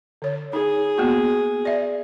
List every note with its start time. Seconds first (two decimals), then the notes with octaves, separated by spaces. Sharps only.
0.22 D3 C#5
0.53 D#4 G#4
0.98 A#3 B3 F#4
1.65 D5 E5